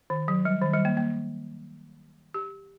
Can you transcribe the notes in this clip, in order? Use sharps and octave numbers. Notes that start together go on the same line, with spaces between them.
D#3
F#3
G3
D#3
G3
A#3
A#3
G4